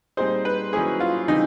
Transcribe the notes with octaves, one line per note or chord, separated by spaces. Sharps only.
A#2 G3 C4 D#4 G#4 C5
B4
D#3 F#3 A#3 C#4 E4 G#4
F4
C#3 E3 G3 C4 D#4 E4